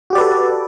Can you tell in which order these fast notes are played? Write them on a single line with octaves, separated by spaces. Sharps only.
F#4 G4 D5 B4 A4